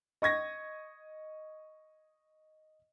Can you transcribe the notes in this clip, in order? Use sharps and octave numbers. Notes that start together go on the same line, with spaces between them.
D#5 C#6 G#6 A#6